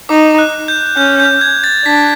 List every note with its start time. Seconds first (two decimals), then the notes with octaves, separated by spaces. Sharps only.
0.09 D#4 D6
0.38 F#6
0.68 G6
0.97 C#4 G6
1.20 G6
1.41 G#6
1.64 A6
1.85 D4 B6